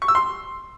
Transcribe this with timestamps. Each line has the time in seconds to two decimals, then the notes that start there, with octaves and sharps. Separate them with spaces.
0.02 C#6
0.08 E6
0.15 C6